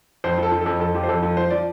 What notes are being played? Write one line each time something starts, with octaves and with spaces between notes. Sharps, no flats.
F2 C5
F3
A4
F3
F2 A4
F2 A4
F3 G4
C5
F2 A4
F3 A4
F3 C5
F3 D5